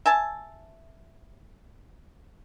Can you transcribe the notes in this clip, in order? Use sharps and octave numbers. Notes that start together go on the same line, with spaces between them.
E5 G#5 A5